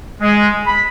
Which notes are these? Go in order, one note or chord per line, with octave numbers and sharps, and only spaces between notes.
G#3
B5